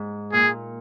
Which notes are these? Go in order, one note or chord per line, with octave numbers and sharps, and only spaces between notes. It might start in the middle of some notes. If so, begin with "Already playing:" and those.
Already playing: G#2
A#2 G#4